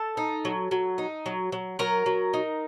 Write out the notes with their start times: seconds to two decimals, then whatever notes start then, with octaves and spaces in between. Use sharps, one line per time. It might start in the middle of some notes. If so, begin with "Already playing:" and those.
Already playing: A4 A5
0.17 D#4
0.45 F#3
0.71 F#3
0.98 D#4
1.26 F#3
1.52 F#3
1.79 F#3 A#4 A#5
2.06 F#3
2.34 D#4